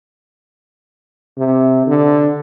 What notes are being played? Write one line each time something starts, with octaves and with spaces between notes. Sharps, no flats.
C3
D3